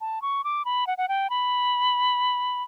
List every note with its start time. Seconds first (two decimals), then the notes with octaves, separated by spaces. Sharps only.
0.01 A5
0.22 C#6
0.44 D6
0.65 B5
0.87 F#5
0.98 F#5
1.08 G5
1.30 B5